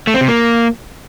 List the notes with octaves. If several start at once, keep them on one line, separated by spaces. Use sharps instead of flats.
A3
C4
C3
A#3